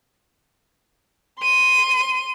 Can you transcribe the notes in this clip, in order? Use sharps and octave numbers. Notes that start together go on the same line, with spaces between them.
C6 D#7